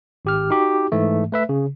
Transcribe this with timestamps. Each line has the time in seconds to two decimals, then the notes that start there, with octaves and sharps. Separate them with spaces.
0.25 G#1 G4 F6
0.50 D#4 F#4 G4
0.92 G#2 E3 A3
1.32 A3 B4 E5
1.49 C#3